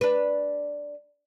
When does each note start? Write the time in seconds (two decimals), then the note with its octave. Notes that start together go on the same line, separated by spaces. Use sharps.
0.01 D4 B4